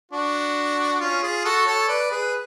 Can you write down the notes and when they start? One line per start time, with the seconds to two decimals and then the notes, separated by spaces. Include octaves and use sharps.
0.12 D4 F#4
1.00 C#4 F4
1.23 F4 G#4
1.45 F#4 A4
1.66 A4 C#5
1.88 B4 D5
2.11 G#4 B4